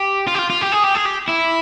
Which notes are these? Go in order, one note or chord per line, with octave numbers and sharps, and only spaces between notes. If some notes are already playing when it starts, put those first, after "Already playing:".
Already playing: G4
F4
G4
F4
F4
G4
G#4
G4
G#4
G4
E4